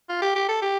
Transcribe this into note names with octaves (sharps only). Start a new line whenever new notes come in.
F4
G4
G4
A4
G4